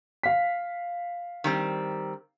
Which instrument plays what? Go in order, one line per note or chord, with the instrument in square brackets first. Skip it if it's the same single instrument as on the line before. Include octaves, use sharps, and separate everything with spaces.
[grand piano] F5 B6
[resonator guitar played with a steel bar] D#3 G3 C4